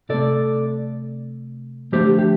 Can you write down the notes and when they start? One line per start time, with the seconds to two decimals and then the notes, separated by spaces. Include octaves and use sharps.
0.09 C3 A3 A4 D5
1.92 D3 F3 A3 G4 C5
2.19 G4